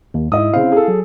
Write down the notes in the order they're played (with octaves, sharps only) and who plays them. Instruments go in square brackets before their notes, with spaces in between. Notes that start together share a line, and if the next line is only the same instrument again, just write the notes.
[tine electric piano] D#2
[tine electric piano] G#2 [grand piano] E4 D#5 D#6
[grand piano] C#3 C4 [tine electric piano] E4 F5
[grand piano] G#4 A4
[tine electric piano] F#3